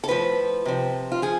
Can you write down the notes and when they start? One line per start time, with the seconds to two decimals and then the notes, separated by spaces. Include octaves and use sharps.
0.04 A4
0.08 A2 F3 B4
0.65 C3 F3
1.12 F4
1.22 F3 G#4